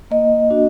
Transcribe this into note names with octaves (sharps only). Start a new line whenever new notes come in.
A#3 D#5
D4 F#4